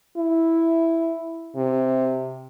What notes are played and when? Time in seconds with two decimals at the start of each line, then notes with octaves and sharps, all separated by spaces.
0.17 E4
1.57 C3